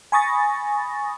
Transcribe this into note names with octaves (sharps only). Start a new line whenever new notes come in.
G#5 B5 C#6 D#6 A6 A#6